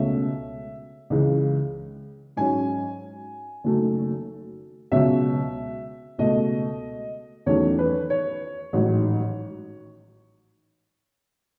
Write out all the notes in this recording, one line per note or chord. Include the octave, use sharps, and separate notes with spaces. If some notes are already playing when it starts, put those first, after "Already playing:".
Already playing: C#2 B2 A3 C#4 E5
C#2 C#3 E3 G#3
G#2 F#3 C#4 G#5
F#1 F#2 D#3 F#3 A3
C#2 B2 F#3 C#4 E5
C#2 B2 A3 D#5
E2 D#3 F#3 A3 C#4 C#5
B4
C#5
A1 G#2 D#3 F#3